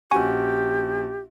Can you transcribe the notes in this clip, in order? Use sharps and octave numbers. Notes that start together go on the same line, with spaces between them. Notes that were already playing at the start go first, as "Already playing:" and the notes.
A#1 C#4 F#4 G4 G#5 C#6